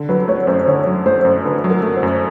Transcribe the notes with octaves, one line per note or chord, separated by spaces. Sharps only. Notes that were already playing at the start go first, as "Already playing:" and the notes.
Already playing: D3
F#3 B4
A3 C#5
F#2 C5
D3 C#5
F#3
A3 C5
F#2
D3 B4
F#3
A#4
A3
C5
F#2